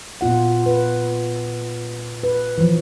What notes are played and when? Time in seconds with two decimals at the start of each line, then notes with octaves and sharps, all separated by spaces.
0.21 A#2 B3 F4 F#5
0.66 B4
2.23 B4
2.58 E3 F3